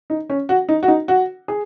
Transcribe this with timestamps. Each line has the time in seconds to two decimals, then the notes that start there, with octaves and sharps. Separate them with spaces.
0.10 D#4
0.30 C#4
0.49 F#4
0.69 D#4
0.83 F#4
0.88 D#4
1.08 F#4
1.48 G#4